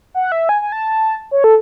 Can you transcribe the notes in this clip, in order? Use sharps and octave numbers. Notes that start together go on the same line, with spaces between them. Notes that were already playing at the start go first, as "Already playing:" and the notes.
F#5
E5
G#5
G#5
A5
C#5
A4